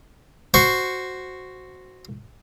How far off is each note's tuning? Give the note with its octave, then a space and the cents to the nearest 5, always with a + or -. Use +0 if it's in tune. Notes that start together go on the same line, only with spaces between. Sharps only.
F#4 +0 C5 +0 C#6 +0